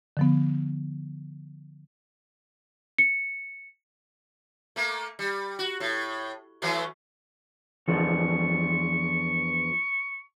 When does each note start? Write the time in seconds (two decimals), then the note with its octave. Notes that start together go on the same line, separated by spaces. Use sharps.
0.17 D3 F3 B3
2.98 C#7
4.76 A3 A#3
5.19 G3
5.59 F#4
5.80 A2
6.62 E3 F#3 A3
7.88 E2 F3 D4 C#6